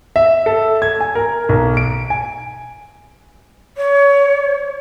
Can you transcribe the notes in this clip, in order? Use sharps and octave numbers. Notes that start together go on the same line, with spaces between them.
E5
A4
G#6
G#5
A#4
B1
D7
G#5
C#5